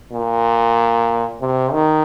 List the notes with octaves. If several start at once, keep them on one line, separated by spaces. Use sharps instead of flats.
A#2
C3
D#3